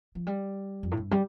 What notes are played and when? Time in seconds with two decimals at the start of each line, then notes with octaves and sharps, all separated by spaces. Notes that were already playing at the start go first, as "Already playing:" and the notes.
0.15 F3
0.27 G3
0.83 F2
0.92 A2
0.97 G2
1.11 G3